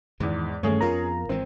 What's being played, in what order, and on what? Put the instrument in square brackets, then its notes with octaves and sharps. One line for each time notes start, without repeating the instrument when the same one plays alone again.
[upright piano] E2 G#2 [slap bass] D#3 E3 G#3
[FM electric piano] G2 A3 [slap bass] D#3 E3 A#3 [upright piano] C#4 G#4 C#5
[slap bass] F2 B3 [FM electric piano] F4 A#4 A#5
[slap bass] G#1 E3 G#3 [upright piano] C4